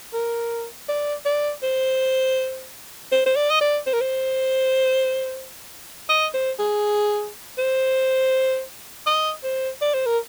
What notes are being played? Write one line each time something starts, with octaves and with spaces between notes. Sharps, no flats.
A#4
D5
D5
C5
C5
C5
D5
D#5
D5
C5
A#4
C5
D#5
C5
G#4
C5
D#5
C5
D5
C5
A#4